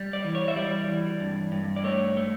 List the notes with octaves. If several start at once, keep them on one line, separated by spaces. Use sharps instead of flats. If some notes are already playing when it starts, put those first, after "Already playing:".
Already playing: G3
D5
E3
C#5
E5
G3 D5
E3
G2
G2
D5
A3 C#5
A3